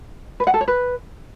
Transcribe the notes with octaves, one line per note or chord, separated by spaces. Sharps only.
B4
F#5
A4
C#5
B4